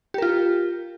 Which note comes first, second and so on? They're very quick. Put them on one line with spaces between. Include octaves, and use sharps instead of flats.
G4 A#4 F4